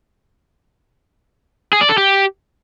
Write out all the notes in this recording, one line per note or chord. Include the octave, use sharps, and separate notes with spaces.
G#4
D5
A4
G4